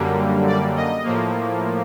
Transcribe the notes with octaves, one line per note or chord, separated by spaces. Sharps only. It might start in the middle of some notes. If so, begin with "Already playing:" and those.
Already playing: F#2 D3 G3 A#3
D5
D#5
A2 F3 A#3